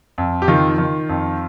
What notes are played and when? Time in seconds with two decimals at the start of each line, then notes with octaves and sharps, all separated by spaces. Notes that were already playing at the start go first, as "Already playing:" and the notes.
0.18 F2
0.42 G4
0.48 D#3 F4
0.78 D#3
1.09 F2